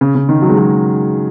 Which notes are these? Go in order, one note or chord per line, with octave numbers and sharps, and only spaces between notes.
C#3
C#3
D#3
F#3
G#3
F#3